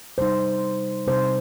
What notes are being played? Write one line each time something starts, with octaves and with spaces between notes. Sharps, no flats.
C3 G3 D#4 C5
C3 G3 D#4 C5